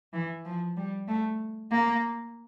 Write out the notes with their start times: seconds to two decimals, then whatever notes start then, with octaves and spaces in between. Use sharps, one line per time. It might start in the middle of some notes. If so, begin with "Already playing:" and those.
0.13 E3
0.45 F3
0.77 G3
1.08 A3
1.71 A#3